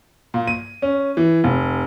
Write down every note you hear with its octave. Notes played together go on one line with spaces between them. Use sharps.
A#2
D#7
C#4
E3
F1